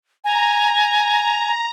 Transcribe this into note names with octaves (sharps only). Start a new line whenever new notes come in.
G#5 A#5